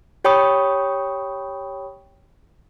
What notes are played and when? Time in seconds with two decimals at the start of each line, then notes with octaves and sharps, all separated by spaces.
0.24 G4 C#5 G5 B5 C#6 D#6